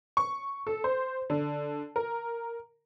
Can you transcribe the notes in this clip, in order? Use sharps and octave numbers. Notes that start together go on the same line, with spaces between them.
C#6
A4
C5
D3
A#4